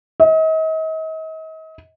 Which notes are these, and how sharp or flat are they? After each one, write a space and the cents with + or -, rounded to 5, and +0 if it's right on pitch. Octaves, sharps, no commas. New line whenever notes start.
D#5 +40